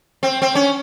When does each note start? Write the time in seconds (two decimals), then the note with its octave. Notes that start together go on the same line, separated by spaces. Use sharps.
0.23 C4
0.42 C4
0.55 C#4